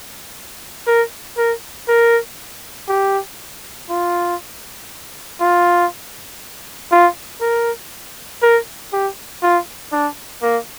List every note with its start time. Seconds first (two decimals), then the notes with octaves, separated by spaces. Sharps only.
0.87 A#4
1.37 A#4
1.88 A#4
2.88 G4
3.90 F4
5.40 F4
6.92 F4
7.41 A#4
8.42 A#4
8.93 G4
9.43 F4
9.92 D4
10.43 A#3